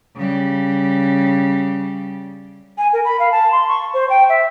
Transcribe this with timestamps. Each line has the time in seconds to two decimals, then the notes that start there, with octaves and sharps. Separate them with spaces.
0.16 C#3 G3
2.78 G#5
2.93 A#4
3.05 B5
3.20 F5
3.32 A5
3.52 C6
3.68 C#6
3.94 C5
4.10 G5
4.29 E5